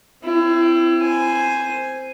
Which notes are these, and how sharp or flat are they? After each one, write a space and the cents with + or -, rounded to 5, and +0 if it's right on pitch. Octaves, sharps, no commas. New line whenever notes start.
C4 +0 E4 +30
C5 +0 G#5 +0